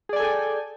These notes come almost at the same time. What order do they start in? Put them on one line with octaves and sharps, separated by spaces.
G#4 D5 G#5 A4 G5